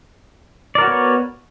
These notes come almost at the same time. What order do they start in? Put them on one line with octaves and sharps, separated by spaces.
D5 A#4 F#4 C#5 B3